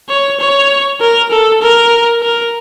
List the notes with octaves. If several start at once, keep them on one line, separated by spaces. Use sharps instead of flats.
C#5
C#5
A#4
A4
A#4
A#4